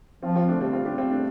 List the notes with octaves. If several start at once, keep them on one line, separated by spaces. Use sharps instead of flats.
F3 C4 F4
C4 F4
A3 D4
G3 C4
C4 F4
D4 G4
C4 F4
A3 D4